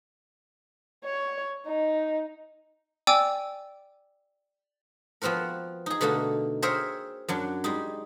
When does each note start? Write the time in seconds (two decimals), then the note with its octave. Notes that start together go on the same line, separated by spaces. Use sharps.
1.04 C#5
1.66 D#4
3.07 D5 G5 G#5 D6 E6
5.22 F3 B3 C4 F#4 A#4
5.86 D#4 G#4
6.01 B2 D3 A3 A#3 D#4
6.62 G#4 A#4 C5 C#5 E5 G5
7.28 F#2 F#3 D4
7.64 G3 G#3 D#4